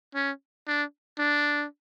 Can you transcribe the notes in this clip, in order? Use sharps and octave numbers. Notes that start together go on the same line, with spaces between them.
C#4
D4
D4